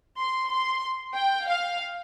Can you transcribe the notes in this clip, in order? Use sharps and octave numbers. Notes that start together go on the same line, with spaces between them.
C6
C6
G5
F5